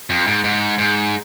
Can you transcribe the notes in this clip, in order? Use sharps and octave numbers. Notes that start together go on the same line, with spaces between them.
F2
G#2
G#2
G#2